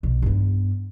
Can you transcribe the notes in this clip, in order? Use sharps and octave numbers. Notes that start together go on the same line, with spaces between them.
B1
G2 B3